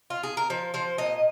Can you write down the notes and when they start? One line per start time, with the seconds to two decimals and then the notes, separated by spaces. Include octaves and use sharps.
0.10 F4
0.23 G#4
0.37 A#4
0.50 F3 C5
0.74 F3 C5
0.98 A#2 D#5